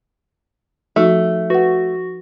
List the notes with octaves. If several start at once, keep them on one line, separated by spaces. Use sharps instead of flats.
F3 A3 D#4 F#4
F#4 B4 F#5